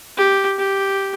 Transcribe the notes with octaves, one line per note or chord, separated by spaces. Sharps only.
G4
G4